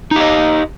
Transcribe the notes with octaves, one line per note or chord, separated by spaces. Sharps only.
D#4 G4 D#5